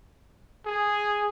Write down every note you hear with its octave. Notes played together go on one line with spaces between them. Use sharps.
G#4